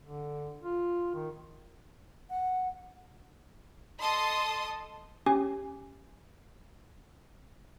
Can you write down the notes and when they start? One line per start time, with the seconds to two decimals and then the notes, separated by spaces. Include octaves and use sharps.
0.03 D3
0.64 F4
1.14 D#3
2.30 F#5
4.01 A4 D#5 A5 C6 D#6
5.26 C#4 G4 G#5